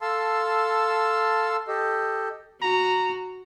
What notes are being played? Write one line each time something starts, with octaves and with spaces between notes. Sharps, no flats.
A4 F5 A5 C6 E6
G4 A4 D#5
F#4 A#5